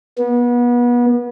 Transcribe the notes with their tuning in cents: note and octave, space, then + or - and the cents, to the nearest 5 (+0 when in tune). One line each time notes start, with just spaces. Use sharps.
B3 -30